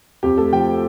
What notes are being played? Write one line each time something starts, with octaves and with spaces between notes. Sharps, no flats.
F2 G4
A3 A4
F3 G5